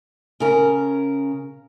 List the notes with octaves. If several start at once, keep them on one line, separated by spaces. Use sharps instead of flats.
C#3 A#4